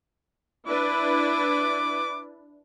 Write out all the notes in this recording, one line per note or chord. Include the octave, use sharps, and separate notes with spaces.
D4 E4 B4 D6